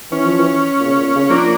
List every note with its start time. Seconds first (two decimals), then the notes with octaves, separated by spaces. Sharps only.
0.12 E3 C#4
0.25 F3
0.39 E3
0.80 A#2
0.86 C#3
1.00 A#2
1.15 C#3
1.30 F3 A#3 D4